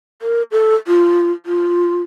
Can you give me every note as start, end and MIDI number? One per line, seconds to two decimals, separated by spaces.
0.22 0.43 70
0.52 0.75 69
0.87 1.33 65
1.46 2.02 65